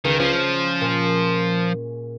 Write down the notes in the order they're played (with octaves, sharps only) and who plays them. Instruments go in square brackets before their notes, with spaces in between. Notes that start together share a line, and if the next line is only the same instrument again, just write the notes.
[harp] C#2 [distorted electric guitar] D#3
[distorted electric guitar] F3 [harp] C#4 C7
[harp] A#2